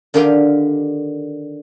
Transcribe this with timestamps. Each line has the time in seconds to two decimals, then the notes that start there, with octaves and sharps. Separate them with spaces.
0.14 D3 D#3 G4 F5 G5 G#5